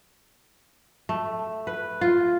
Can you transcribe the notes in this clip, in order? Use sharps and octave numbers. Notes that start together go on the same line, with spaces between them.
A3
B4
F4